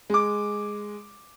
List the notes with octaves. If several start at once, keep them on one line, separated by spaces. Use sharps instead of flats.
G#3 D6